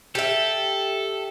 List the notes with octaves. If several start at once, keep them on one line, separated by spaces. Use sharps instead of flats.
G4 A4 E5